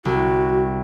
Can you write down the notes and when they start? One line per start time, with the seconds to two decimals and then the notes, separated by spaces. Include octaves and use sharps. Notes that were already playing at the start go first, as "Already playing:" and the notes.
0.05 C2 F#4